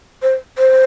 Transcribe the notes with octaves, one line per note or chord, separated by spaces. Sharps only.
C5
C5